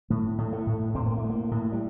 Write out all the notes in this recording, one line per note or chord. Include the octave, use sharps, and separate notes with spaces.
A2 A3
A2
A3
A2
A2 C4
A#3
A2 A3
A#3
A2
G3